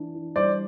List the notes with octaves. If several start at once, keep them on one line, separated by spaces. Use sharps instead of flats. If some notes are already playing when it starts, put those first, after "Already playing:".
Already playing: E3 D4
E3
G3 C5 D5